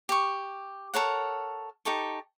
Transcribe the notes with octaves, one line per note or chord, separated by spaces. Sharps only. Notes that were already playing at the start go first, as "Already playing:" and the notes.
G4 C#6
A4 A#4 C#5 F#5
D#4 G4 A4 C#6